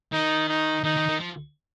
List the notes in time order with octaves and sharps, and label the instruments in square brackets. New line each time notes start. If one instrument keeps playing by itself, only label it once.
[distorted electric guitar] D#3 [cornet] D#4
[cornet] D#4
[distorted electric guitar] D#3 [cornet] D#4
[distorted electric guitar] D#3
D#3
F3